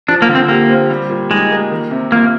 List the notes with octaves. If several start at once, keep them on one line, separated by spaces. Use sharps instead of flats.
F3 D4
A#3
D3
C4
A#3 G4
C4
G3
A#2
G#3 D#4
A#3
D#3
C3
A#3 F4